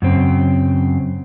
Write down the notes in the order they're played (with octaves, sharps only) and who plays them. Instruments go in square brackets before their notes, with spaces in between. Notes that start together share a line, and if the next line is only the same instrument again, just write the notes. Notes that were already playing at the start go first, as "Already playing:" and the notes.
[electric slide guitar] F#2 C#3 C4